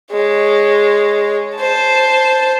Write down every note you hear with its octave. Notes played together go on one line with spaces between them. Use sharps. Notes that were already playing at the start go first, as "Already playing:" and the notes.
G#3 C#5
C5 A5